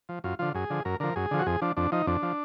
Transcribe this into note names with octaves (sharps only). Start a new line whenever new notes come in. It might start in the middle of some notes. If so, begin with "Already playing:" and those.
F3
F#2 F4
D3 F3 F4
F#2 G#4
D3 F3
F#2 A#4
D3 F3 A#4
F#2 G#4
D3 F3
F#4
F2 G#4
F3 D4
F2 D4
F3 D#4
F2 D4
F3